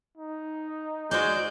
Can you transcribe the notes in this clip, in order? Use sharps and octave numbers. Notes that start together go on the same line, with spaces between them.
D#4
G#3 F#4 C5 D5 G6